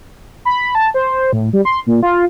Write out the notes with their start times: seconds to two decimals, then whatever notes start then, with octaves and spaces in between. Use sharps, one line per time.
0.45 B5
0.75 A5
0.94 C5
1.33 A2
1.53 G3
1.65 C6
1.87 A#2
2.03 F4